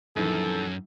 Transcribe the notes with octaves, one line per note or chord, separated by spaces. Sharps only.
A#1 F#2 D#3 E3 A4